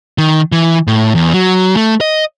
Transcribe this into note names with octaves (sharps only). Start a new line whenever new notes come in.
D#3
E3
A2
E2
F#3
A3
D#5